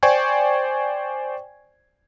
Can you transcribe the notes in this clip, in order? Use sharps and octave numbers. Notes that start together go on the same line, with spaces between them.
C5 D5 G5 G#5 C#6 G#6